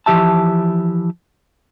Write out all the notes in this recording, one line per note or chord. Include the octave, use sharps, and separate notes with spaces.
E3 F3 G4 E5 A5